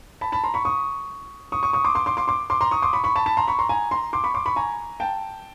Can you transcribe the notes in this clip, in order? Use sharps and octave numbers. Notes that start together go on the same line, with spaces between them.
A5 B5
A5 B5
A#5 C6
B5 C#6
C#6 D#6
C#6 D#6
C#6 D#6
C#6 D#6
C6 D6
C6 D6
C6 D6
C6 D6
C6 D6
C6 D6
A#5 C6
C#6 D#6
C6 D6
B5 C#6
B5 C#6
A5 B5
A5 B5
A#5 C6
B5 C#6
A#5 C6
G#5 A#5
A#5 C6
C6 D6
B5 C#6
C6 D6
B5 C#6
G#5 A#5
G5 A5